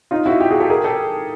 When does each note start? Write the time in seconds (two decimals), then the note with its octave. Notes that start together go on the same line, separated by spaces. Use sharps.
0.11 D#4 F4
0.26 E4 F#4
0.40 F4 G4
0.51 F#4 G#4
0.60 G4 A4
0.70 G#4 A#4
0.84 G4 A4